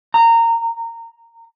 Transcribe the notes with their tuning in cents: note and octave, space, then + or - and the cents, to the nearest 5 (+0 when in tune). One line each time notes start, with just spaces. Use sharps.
A#5 -20